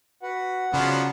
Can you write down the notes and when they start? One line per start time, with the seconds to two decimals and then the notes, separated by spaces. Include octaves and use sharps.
0.23 F#4 B4 F#5
0.74 C#3 F3 F#3 B3 D5